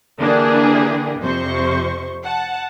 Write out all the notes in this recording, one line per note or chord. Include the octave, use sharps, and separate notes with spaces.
D3 E3 A#3 D4 G4 G#4
F2 C3 C5 C#6
F#5 A5